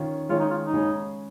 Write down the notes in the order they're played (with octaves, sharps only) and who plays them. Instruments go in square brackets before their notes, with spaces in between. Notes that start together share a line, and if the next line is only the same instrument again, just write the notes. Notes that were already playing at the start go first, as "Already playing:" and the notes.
Already playing: [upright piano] D#3 C#4 F4 C#5
[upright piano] D#3 G#3 C#4 G#4 C#5 [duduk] F4
[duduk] D#4
F4
D#4
[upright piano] C#3 G#3 C#4 G#4 C#5